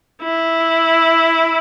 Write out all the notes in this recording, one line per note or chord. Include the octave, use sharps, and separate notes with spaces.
E4